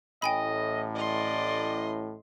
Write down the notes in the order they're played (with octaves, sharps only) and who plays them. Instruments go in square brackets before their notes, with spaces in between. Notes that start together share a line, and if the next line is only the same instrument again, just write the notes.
[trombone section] A1 A2 [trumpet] D#5 [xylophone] G5 G#5 B5
[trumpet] D5 [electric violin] D#5 C6